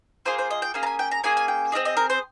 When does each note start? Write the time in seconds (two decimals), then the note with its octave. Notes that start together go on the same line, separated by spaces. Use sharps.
0.25 A#3 F4 G#4 C5
0.38 C5
0.50 D#5
0.62 G5
0.74 A#3 C#4 G#4 F5
0.83 A#5
0.86 G#5
0.99 G5
1.11 A#5
1.24 A#3 C#4 G#4 G#5
1.37 G#5
1.48 G5
1.72 C4 F4 G#4 D#5
1.85 D#5
1.97 A#4
2.10 C5